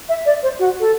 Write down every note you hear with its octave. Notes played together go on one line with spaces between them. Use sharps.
E5
D5
C5
F#4
A4